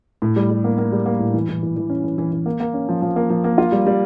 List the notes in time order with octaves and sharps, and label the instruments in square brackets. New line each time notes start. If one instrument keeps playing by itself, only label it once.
[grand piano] A2
G3
G3
A#3
A#3
G3
A#3
A2
E3
E3
E3
E3
C#4
E3
E3
E3
A#3
A#3
C#4
F3
F3
A#3
F3
A#3
F4
G3
G3